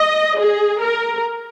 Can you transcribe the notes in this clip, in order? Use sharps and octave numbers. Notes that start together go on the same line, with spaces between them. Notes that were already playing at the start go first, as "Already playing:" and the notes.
Already playing: D#5
G#4
A#4